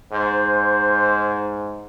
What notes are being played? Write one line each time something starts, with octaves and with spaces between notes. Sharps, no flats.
G#2 C5